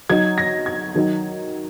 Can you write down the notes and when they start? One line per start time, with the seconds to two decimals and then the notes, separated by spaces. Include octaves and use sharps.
0.10 F#3 D#4 G#6
0.38 A#6
0.66 G#6
0.95 D#3 F#3 D#4